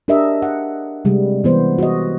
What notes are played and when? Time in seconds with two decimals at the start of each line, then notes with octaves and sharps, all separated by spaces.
0.08 D4 G4 A#4 D#5 E5
0.42 F#5
1.05 C3 G3 G#3
1.44 E3 B3 C5
1.79 F#4 D#5